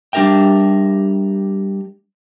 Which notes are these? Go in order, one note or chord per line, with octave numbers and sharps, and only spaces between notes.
G3 D4 G4 A#4 E5 G5